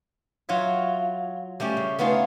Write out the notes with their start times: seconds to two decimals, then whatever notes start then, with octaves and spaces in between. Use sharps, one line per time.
0.49 F#3 F4 C#5 E5
1.60 G3 A3 C#4 G4
1.77 C#3
1.99 A3 B3 D#4 F4 G#4